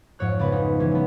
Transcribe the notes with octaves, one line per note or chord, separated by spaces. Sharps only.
F2 G#2 C#5 F#6
C#2 B3 C#4 B4
D#4
E3 G#3 C#4
F#3 B3